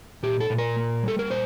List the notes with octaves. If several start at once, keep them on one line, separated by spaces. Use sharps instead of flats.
A#2 G4
A4
A#2
A#4
A#3
G3 A4
A#4
A#2 C5